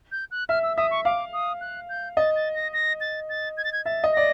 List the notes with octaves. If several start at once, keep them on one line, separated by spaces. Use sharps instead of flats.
G6
F#6
E5 F6
E6
E5 D#6
C#6
F5 D6
D#6
F#6
G6
D#5 A6
A6
A#6
A#6
A6
A6
G#6
A6
G#6
E5 A6
D#5
D5 A#6